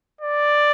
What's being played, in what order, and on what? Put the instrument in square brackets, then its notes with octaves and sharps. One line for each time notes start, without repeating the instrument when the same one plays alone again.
[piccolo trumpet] D5